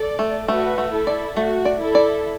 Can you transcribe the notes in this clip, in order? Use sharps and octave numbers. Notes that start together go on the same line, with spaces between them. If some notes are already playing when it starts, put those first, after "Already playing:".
Already playing: A4 D5
A3
A3 F#4 B4
A3
E4 A4
D5
A3 F#4
D5
E4 A4
D5